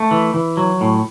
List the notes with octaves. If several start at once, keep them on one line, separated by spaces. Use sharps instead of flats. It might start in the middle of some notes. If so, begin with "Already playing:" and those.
Already playing: A3
E3
E3
F#3
A2